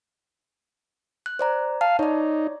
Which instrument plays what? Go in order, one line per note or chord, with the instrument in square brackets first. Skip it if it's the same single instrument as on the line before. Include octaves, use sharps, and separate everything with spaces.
[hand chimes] F#6
C5 D5 A#5
[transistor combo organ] F5 [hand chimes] A5
[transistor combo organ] D#4 [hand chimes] C#5 D5